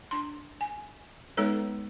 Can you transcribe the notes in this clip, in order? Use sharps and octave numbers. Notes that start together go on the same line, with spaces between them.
D4 C6
G#5
G#3 B3 D#4 A4 B4 C#5